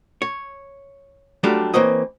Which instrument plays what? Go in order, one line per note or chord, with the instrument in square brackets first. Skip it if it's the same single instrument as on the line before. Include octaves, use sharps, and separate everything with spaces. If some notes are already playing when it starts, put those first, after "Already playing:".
[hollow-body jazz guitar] C#5
F#3 G3 A3 D4 F4 G4
E3 A#3 C4 C#5 D#5